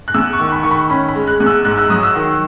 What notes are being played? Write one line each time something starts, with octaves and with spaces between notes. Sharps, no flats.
F#6
E2 E6
C#6
D#3
B5
D#3 C#6
B5
C#4 B5
B5
G#3
F#6
E2
E6
G#2 F#6
E6
F#3 D#6
E6
D#3